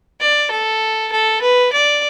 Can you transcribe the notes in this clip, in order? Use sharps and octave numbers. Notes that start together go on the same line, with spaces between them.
D5
A4
A4
B4
D5